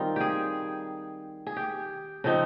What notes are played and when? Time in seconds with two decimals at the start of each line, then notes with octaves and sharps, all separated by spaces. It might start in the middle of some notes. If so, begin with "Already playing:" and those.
Already playing: D#3 G3 C4 D#4 F4
0.16 G4 G#4
1.47 G#4
1.56 G4
2.24 C#3 F3 C4 D#4